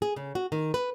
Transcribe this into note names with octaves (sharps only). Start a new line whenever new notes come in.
G#4
C#3
F#4
D#3
B4